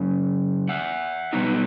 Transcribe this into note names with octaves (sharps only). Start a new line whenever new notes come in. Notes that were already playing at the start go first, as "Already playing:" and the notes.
Already playing: F#2 C#3
E5 F#5
B2 G3 B3 D#4